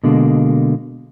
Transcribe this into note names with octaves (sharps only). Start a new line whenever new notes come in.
B2 D3 G#3 A#3